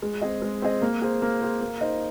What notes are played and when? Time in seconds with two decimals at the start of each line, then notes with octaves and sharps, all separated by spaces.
0.02 G#3
0.21 C4 G#4 D#5
0.42 G#3
0.62 C4 G#4 D#5
0.82 A#3
1.02 G#4 C5
1.22 A#3
1.42 G#4 C5
1.61 A#3
1.81 D#4 C5 D#5